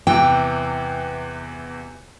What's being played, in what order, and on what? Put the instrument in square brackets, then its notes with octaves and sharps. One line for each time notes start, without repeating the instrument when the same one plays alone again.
[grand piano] E2 C3 E3 [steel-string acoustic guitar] G5